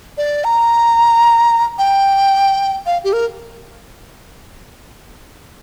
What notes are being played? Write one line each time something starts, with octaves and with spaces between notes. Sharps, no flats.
D5
A#5
G5
F5
G4
A#4